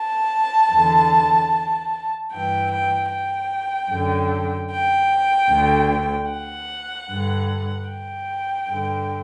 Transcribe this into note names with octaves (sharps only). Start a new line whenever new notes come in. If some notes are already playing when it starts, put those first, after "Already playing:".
Already playing: A5
E2 D3
G2 E3 G5
G5
G5
F#2 D3
G5
D2 D3
F#5
G2 D3
G5
G2 D3